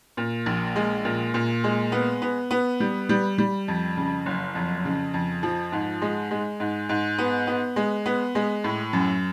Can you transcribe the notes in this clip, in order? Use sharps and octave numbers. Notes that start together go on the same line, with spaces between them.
A#2
A#1
G#3
A#2
A#2
G#3
B3
B3
B3
G3
G3
G3
F2
C#3
F#1
F2
C#3
F2
F3
G#2
G#3
G#3
G#2
G#2
B3
B3
G#3
B3
G#3
A2
F#2